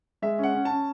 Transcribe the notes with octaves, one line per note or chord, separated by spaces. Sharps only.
G#3 E5
C#4
F#5
C#4
C#4 A5